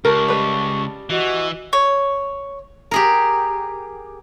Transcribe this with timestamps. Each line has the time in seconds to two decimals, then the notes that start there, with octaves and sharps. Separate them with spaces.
0.05 C#2 G4 A#4 A5 C#6
0.28 G3 B4
1.10 E3 F#4 D#5
1.73 C#5
2.91 G4 G#4 A#4